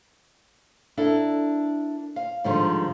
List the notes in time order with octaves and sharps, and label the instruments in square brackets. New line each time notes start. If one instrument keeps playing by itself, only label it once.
[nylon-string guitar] D4 E4 A4 A#4
F5
G#2 D3 D#3 F3 G3